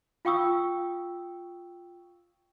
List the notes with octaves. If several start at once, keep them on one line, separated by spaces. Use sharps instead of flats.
F4 F5 G5 C#6 D#6 E6